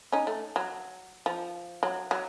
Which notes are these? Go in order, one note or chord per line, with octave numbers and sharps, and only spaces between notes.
C#4 D#4
A3
F#3
F3
F#3
F#3